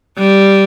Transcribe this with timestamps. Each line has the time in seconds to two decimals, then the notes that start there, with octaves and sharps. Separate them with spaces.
0.19 G3